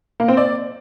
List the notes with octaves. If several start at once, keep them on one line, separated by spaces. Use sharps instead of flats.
A#3
C4
D5